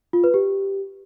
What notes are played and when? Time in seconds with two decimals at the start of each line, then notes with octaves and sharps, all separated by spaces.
0.13 F4
0.24 B4
0.34 G4